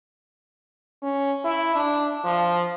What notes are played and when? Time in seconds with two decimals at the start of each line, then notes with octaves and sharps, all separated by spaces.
1.03 C#4
1.45 E4
1.75 D4
2.25 F3